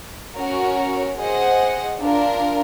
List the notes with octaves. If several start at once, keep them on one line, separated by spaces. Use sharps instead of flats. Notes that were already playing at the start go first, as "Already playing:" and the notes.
C#4 F#4 A#4 C#5
G#4 C5 D#5 F#5
D4 F4 A#4